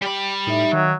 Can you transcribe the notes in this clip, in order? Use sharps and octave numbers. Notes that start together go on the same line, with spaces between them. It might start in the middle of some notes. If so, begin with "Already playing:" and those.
G3 G4 B5
A2 D#4 E5
D#3 F#3